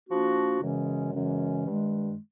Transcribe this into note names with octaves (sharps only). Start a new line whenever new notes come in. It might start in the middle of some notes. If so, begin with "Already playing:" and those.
F3 A#3 D4 F#4
F#2 C#3 E3 G#3 C#4
F#2 C#3 E3 G#3 C#4
G2 D#3 G#3